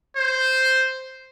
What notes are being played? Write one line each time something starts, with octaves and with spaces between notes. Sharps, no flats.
C5